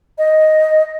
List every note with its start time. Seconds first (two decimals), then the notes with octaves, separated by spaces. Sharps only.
0.18 D#5